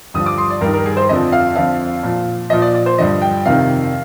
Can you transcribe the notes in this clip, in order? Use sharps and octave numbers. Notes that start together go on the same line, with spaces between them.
G2 D3 F3 D#6
D6
C6
D5
G2 A#4
D#3
A#4
G#4
C5
F2 D3 F3 D#5
F5
F2 D3 F3 F5
A#2 F3
A#2 F3 D#5
D5
D5
C5
G2 D3 F3 D#5
G5
F2 C3 D#3 F5